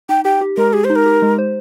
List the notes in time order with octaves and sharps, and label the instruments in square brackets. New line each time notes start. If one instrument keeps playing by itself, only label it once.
[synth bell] D#4 [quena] G5
[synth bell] G4 [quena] G5
[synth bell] G4
[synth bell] G#3 [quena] A#4
[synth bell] G4 [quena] G#4
[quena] C5
[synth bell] D#4
[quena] A#4
[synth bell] G4
G#3
C5